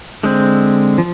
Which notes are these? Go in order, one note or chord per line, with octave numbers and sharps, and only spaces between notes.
D3 G#3 C4
F3